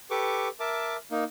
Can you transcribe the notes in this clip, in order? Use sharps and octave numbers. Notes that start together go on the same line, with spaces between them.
G4 A4 B4 C#6 D6
A#4 E5 A5 D6
A#3 D#4